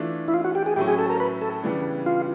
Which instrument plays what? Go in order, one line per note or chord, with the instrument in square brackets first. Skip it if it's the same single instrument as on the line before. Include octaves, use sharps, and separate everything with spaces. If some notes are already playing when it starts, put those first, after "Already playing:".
Already playing: [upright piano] E3 A3 D4 F4
[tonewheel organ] E4
F4
F#4
G4
G#4
[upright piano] A2 F#3 A3 C#4 [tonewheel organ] G4
[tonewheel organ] G#4
A4
A#4
B4
A4
[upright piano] C#3 E3 G3 B3 D4
[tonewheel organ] F4